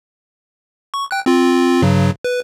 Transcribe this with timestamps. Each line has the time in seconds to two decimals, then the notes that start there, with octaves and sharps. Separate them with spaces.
0.94 C#6
1.11 G5 F#6
1.26 C4 F4
1.82 G2 C#3 F#3
2.24 B4